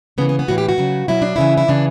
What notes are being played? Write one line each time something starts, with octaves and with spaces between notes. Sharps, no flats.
C#3 E3 B3
B3
B3
A2 E3 F#4
G4
F#4
C#3 F#3
B2 F#3 E4
D4
C#3 E3 E4
E4
C#3 E3 D4